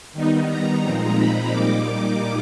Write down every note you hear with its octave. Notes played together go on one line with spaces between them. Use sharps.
D#3 G3 B3 D#4
A#5
A#2 F3 G#3 C4 D#4
B5
A#2 G3 A#3 D#4 D6